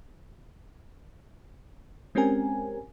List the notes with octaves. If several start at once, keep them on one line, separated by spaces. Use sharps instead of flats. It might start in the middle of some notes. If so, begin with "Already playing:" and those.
G#3 C4 C#4 G4 A#4 G#5